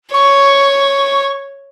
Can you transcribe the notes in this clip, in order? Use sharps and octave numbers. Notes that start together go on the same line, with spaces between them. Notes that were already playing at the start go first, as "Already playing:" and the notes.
C#5 C#6